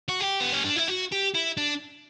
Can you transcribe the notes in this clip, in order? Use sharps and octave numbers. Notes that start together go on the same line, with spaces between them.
F#4
G4
B3
C#4
D4
E4
F#4
G4
E4
D4